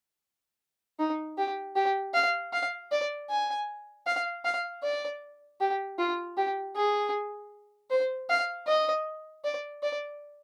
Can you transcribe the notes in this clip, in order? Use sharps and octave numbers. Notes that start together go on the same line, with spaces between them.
D#4
G4
G4
F5
F5
D5
G#5
F5
F5
D5
G4
F4
G4
G#4
C5
F5
D#5
D5
D5